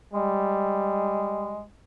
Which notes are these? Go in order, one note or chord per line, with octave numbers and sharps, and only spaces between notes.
G3 G#3